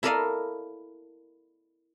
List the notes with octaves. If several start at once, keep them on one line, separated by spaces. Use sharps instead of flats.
E4 A4 A#4 D5 D#5 F5